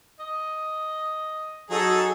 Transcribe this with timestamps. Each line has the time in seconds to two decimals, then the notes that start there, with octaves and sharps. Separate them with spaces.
0.19 D#5
1.70 F#3 D#4 G#4 A4